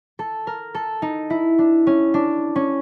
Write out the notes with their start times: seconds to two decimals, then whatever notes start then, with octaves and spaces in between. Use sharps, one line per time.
0.19 A4
0.47 A#4
0.75 A4
1.02 D#4
1.30 E4
1.59 D4
1.87 C#4
2.14 D4
2.56 C#4